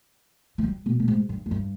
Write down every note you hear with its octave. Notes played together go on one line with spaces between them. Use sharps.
F3
G3
B2
B2
G#2
G2
F2
G2